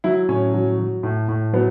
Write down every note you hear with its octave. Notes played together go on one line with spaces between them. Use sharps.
F#3 E4
A2 C#4
F#3
F#3
A2
A2
F#3 B3